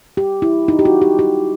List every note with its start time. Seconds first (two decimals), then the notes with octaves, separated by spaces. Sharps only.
0.17 G4
0.42 E4
0.68 D#4
0.79 G4
0.85 F#4
1.02 G4
1.19 G4